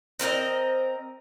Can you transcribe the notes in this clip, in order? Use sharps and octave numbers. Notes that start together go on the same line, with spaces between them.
C4 A#4 C#5 D#5